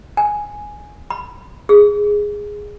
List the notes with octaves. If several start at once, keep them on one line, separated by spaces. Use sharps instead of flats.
G#5
B5
G#4